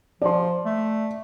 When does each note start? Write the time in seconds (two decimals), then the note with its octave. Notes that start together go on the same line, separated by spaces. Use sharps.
0.22 F3 D5 C6
0.66 A3